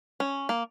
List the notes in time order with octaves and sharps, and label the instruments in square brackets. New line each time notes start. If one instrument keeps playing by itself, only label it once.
[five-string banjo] C#4
A#3